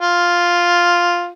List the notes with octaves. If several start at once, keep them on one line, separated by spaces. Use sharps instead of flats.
F4